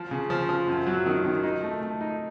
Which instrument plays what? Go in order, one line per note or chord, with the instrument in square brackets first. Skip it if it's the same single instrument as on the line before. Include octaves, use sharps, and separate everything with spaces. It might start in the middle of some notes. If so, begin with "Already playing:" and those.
Already playing: [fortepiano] F3
C#3
F3
F3
F#2
F#3
D#3
D#3
D#4
A3
A3
D#4